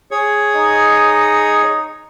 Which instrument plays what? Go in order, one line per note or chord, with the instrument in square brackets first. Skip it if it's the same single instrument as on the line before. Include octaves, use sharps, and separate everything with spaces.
[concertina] G#4 C#5
[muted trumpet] D#4